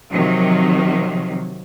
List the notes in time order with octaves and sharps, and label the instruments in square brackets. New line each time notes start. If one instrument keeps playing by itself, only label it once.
[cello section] C3 D#3 F3 F#3